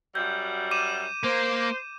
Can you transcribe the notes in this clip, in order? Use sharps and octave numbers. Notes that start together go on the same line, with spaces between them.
F#2 G3 F#4 G6
D6 D#7 E7
A#3 C5